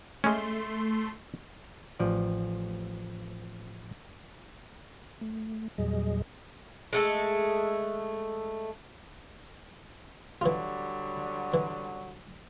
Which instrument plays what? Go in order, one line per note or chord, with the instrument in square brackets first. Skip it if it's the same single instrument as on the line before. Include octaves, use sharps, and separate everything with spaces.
[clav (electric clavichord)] G#3 C#4 [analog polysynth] A3 C6
[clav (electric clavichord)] A1 F3 D5
[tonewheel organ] A3
E2 A#2 F#3 G3 G#4 D#5
[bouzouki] G#3 A3 A4
[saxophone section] D3 F#3 G3 [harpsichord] E3 F4
[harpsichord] E3